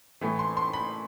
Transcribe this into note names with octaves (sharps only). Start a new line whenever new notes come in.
A2 E3 A3
C6
C6
B5